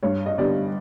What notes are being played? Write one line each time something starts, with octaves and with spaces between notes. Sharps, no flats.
G2 C#5
D#5
D3 G3 B3 D5